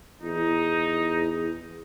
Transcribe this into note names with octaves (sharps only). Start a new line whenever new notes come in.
E2 D#4